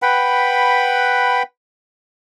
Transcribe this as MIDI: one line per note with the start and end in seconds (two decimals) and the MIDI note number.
0.02 1.43 71
0.02 1.43 78
0.02 1.43 79
0.02 1.43 83